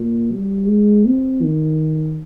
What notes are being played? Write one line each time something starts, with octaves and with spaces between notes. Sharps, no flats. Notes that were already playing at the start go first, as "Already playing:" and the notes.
Already playing: A#2
G3
G#3
C4
D#3